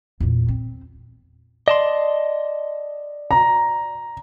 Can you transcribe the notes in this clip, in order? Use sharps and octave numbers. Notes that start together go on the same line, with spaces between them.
E2 A#2
C4
D5 D#5 A5 C6
A#5